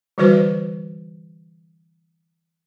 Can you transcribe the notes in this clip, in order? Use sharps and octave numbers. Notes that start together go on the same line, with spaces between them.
D3 E3 G3 F#4 B4 C5